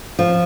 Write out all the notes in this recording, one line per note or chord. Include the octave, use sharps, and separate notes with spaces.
F3